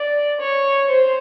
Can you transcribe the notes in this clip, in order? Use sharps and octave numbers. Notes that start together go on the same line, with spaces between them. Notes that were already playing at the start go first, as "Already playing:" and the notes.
Already playing: D5
C#5
C5